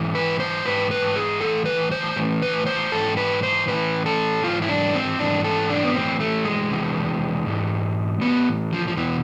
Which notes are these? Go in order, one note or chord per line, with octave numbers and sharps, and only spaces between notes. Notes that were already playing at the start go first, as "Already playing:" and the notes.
Already playing: G#2 E3
B4
C5
G#2 E3 B4
B4
G#4
A2 E3 A4
B4
C5
A2 E3
B4
C5
G#2 E3 A4
B4
C5
A2 E3 B4
A4
G#2 E3 F4
E4
D4
C4
G#2 E3 D4
A4
D4
B3
A2 E3 C4
A3
G#3
E2 C3 E3
G#2 E3
A2 E3 B3
F3
F3
E2 B2 E3